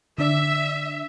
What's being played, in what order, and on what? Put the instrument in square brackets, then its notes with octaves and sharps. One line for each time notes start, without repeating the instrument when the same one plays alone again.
[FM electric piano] D3 D4 D5 [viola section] E5